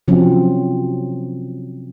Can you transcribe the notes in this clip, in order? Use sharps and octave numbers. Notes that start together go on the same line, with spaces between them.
C3 F3 F#3 C4 C#4